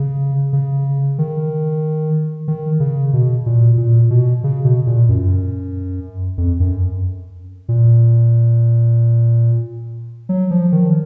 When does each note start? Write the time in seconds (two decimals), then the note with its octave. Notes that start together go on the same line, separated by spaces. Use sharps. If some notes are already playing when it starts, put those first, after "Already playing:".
Already playing: C#3
0.53 C#3
1.18 D#3
2.48 D#3
2.80 C#3
3.13 B2
3.46 A#2
3.77 A#2
4.10 B2
4.44 C#3
4.65 B2
4.87 A#2
5.09 F#2
6.38 F2
6.60 F#2
7.69 A#2
10.29 F#3
10.51 F3
10.72 D#3